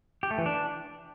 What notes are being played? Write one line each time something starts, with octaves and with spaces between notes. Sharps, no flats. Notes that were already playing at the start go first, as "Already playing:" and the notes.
G4
A3
E3
D4